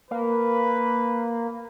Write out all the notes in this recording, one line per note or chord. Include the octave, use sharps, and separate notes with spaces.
A#3 B4